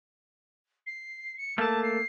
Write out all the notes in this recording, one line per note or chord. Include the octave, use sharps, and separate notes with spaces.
C7
C#7
A3 A#3 A5
C7